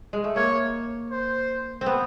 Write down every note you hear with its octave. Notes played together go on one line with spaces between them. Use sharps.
G#3
A3
A#3 C#5
C5
C4
B3